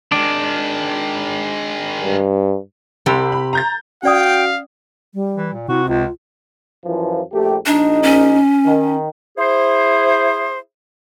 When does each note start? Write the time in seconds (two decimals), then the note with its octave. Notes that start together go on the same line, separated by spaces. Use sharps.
0.12 D#3 G#3 D4
2.02 G2
3.06 C2 C3 G4 B5
3.32 B5
3.53 A#5 G6 A6
4.03 C#4 F#4 D5 F5 G5 D#6
5.14 G3
5.36 E3
5.53 A#2
5.68 C3 E4 F#4
5.88 C#2 F4
6.85 F#2 E3 F3
7.32 A#1 A3 G4
7.66 A#1 D4 D#4
8.03 C#4
8.65 D#3
9.37 E4 G#4 C5